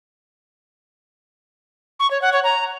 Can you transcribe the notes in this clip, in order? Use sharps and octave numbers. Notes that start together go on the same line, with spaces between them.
C#6
C#5
F#5
C#5
A#5